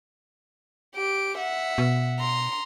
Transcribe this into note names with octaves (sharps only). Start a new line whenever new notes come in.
G4 D7
E5 F#5
B2
A#5 C6